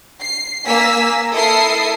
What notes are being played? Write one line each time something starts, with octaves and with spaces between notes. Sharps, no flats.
C7
A#3 G#5 E6 B6
E4 A4 A#4 E5 D#6 C7